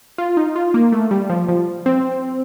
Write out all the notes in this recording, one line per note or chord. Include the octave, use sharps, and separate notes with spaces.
F4
D#4
F4
A#3
A3
G3
F3
F3
C4